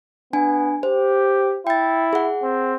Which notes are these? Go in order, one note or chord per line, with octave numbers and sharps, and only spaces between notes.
B3 D4 G#5
G4 C5
E4 G5 A6
G#4 F#5
C4